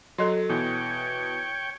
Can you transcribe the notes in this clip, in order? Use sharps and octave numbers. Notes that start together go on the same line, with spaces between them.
F#3 A4 D#5 C6
B2 E3 C#5 G5